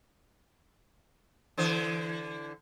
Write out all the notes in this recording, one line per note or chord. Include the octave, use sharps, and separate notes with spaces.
D3 E3 C5